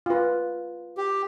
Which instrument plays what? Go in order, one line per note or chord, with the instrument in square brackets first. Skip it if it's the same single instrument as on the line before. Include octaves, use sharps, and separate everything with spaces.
[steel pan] F4 B4
[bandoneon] G4